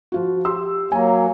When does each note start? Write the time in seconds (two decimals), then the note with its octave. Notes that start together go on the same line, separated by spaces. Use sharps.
0.12 F3 F4 F#4
0.45 G4 C6 E6
0.92 F#3 A#3 G#5 A#5